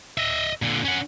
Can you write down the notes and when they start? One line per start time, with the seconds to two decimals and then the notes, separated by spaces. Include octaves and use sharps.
0.18 D#5 E5
0.62 A#2 D3
0.85 C#4 F#5